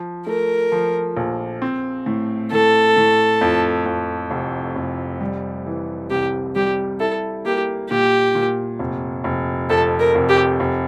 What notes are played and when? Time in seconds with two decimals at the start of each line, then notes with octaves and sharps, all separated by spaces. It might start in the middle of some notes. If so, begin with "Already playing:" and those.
Already playing: F3
0.27 A3 A#4
0.72 F3
1.17 A#1
1.62 C4
2.06 A2
2.52 A2 A4
2.97 A2
3.41 F2
3.86 F2
4.31 F1
4.75 F1
5.21 G3
5.66 E3
6.11 C2 G4
6.55 G3 G4
7.00 E4 A4
7.45 A#3 G4
7.90 A#2 G4
8.35 A#2
8.79 F1
9.24 F1
9.70 F2 A4
10.00 A#4
10.15 F1
10.29 G4
10.60 F1